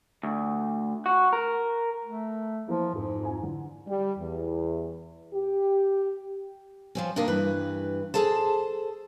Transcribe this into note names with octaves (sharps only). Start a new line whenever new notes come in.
D2
F#4
A#4
A3
E3 F3 A#3
F2 G#2 A4
F2 G#5 A#5
D3 E3
G3
E2
G4
F3 C4 C#4
G2 C3 A#3 D4 D#4 A#4
G2 E3 B4
G#4 A4 C5 A5